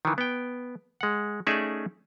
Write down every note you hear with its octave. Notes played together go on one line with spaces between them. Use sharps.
D#3 E3
B3 G5
G#3 F#5
A3 C#4 D#4 G#4 D5 E5